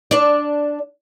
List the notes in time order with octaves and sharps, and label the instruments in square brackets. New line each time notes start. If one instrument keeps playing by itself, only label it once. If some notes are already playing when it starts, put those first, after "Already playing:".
[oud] D4 D5